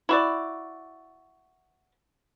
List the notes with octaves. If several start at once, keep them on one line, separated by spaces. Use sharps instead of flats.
E4 F#4 D5